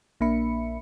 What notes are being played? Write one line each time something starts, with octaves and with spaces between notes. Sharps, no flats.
A#1 A#3 D4 E5 B5 C#7